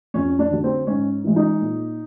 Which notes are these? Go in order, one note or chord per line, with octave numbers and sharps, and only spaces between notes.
F2 C#4
D4
D3 F#3
C4
G#2 C#4
E3 G#3
D#4
A#2